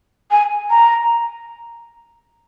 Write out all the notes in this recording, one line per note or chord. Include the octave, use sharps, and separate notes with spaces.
G#5
A#5